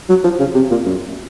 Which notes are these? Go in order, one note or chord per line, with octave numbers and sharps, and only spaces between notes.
F#3
F3
C#3
C3
A#2
F#2